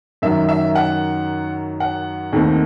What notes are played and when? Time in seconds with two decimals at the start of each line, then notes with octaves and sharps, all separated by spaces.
0.22 F#2 D#3 F#3 E5
0.49 E5
0.75 F#5
1.80 F#5
2.33 D#2 D#3 A3 C4